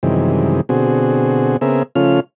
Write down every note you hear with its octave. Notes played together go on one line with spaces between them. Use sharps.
F#2 C3 D#3 E3 G3 G#3
B2 D3 C4 F#4 G#4
C#3 B3 C4 G#4 A#4 E5
C#3 F3 A3 C#4 F4 F6